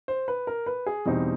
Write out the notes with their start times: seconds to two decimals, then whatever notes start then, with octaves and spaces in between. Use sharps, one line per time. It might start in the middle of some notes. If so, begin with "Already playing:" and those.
0.08 C5
0.28 B4
0.47 A#4
0.66 B4
0.86 G#4
1.06 E2 B2 G3 C4 D#4